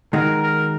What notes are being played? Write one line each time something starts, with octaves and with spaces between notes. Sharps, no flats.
D#3 G#3 D#4 F#4 A#4
A#4